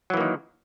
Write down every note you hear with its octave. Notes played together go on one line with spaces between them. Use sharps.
D#3 E3 F#3 A#3